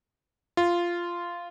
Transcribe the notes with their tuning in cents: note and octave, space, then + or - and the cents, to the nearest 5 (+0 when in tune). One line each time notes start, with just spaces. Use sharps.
F4 -10